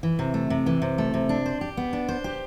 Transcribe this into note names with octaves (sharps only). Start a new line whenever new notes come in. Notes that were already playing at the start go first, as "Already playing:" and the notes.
E3
C3
A3
C3
E3
C3
A3
C3
D4
C5
G4
B3
D4
C5
G4